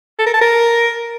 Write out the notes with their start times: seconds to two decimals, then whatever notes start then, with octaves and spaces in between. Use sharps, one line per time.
0.19 A4
0.26 A#4
0.34 A5
0.41 A#4